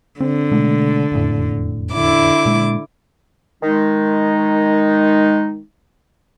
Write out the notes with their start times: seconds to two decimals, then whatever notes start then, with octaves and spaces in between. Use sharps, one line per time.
0.20 D3 C4
0.51 B2 G#3 A3
1.12 E1 F2 A2
1.93 D3 E4 D6
2.46 A#2 G#3
3.63 D#3 G#3 D#4